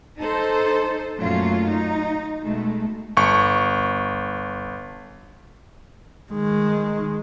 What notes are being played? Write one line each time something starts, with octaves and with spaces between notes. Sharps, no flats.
D#4 A4 C5
F#2 A#2 F#3 A3 C#4 F4
D#4
B2 G#3 A3
G1 C#6
D#3 G#3